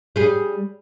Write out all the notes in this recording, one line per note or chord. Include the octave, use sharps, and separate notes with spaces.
G3 G#4